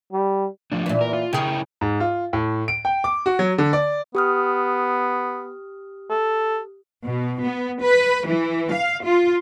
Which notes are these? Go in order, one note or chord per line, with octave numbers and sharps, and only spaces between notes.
G3
F3 A3 D4
A#2 E3
A#4
F4
C#3 E4 G#4 A#4 G5
G#2
F4
A2
D7
G5
D6
F#4
F#3
D3
D5
B3 G4 D#6 F6
A4
B2
B3
B4
E3
F5
F4